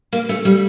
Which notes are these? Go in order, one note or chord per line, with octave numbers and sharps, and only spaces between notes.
A#3
A3
G3